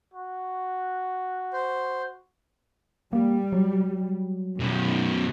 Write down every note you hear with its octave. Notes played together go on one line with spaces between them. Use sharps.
F#4
C5
G3 A#3
F#3
F#2 B2 D#3